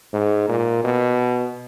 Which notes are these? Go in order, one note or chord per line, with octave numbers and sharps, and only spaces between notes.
G#2
A#2
B2